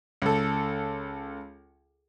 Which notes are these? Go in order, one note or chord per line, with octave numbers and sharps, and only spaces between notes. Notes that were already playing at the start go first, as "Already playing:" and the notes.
C#2 A4